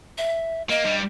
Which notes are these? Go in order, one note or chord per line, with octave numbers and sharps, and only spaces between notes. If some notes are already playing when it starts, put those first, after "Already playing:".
E5
A#3 D#5
G2 G3